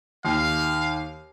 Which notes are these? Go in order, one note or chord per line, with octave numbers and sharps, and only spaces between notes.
D#2 F5